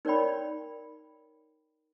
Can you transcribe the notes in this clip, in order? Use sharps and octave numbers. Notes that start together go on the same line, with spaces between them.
D#4 A#4 C#5 D5 G5 B5